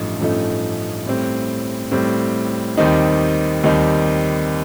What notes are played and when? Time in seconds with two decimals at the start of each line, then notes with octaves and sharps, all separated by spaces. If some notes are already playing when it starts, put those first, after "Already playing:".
Already playing: A1 G2 F3 A3 D#4
0.20 A1 G2 F3 A3 D#4
1.06 A2 G3 C4
1.91 A2 G3 C4
2.77 D#2 D#3 G3 C4 D#4
3.64 D#2 D#3 G3 C4 D#4